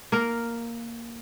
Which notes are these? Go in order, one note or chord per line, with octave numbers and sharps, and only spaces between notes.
A#3 A#4